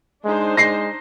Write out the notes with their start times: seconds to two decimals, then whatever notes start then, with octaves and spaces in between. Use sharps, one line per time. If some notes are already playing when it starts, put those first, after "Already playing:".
0.24 G#3 D4 D#4 C5
0.57 G#3 A#6 C7